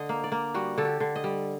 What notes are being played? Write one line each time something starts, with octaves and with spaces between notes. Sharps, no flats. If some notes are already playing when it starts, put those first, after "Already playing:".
Already playing: D3 D#5
A#3
D5
A#3
G3 F#4
D3 A4
G4
D3
D#5
G3